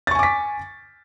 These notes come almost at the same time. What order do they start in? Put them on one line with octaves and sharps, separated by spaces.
A6 C#6 G#5 D6 B6